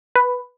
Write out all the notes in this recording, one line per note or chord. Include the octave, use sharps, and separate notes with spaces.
B4